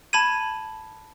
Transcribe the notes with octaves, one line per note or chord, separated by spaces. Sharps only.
A5 B5 G#6 D#7